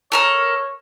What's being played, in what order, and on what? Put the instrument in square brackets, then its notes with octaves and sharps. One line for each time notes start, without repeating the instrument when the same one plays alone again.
[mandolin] A4 A#4 F6 [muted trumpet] C#5